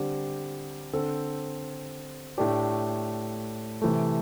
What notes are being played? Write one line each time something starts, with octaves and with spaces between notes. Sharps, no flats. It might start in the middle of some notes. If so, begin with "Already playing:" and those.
Already playing: D3 G3 C4 G4
D3 C4 A4 C5
A2 A3 D4 G4
C3 E3 A3